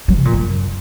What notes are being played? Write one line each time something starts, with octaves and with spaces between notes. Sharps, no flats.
F#3
C3
A#2
F#2